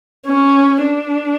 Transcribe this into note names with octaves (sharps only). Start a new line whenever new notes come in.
C#4
D4